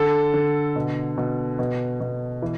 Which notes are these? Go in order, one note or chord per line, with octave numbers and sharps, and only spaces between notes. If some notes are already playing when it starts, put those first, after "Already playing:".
Already playing: D3 A4
D3
B2
B2
B2
B2
E3